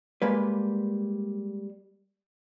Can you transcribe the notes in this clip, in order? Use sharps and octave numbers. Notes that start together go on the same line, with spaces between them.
G3 G#3 A#3 B4